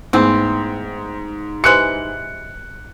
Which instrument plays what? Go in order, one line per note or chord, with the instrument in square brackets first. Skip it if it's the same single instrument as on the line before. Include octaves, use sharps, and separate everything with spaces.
[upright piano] G#2 [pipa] E3 C4 [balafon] A3 B3 E4
[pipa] E3 G#3 [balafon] G4 B4 C5 [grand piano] F#6 C#7